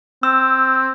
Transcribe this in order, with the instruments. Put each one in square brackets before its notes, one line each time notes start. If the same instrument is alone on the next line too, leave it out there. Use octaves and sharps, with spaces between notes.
[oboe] C4 [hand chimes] E6